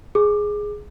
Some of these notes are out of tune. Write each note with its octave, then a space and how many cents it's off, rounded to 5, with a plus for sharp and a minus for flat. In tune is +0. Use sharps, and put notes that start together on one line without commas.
G#4 +0 D6 +20